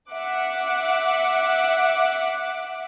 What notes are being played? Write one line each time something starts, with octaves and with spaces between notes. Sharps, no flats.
E5 F#5 D6 F#6